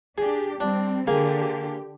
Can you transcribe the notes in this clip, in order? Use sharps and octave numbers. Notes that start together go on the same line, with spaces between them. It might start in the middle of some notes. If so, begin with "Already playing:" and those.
D4 G4 G#4
G3 C4 D4
D3 A#3 G4 G#4